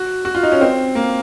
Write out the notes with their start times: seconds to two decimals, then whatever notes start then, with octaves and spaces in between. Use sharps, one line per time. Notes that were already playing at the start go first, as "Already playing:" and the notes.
Already playing: F#4
0.25 F#4
0.35 F4
0.43 D#4
0.52 C#4
0.61 C4
0.95 A#3